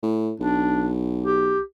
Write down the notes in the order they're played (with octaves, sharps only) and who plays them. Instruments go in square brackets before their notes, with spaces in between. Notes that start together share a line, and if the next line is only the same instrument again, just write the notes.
[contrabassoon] A2
[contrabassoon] B1 [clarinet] D4
[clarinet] G4